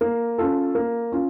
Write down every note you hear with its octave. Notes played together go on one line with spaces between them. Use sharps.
A#3
C#4 F4 A4
A#3
C#4 F4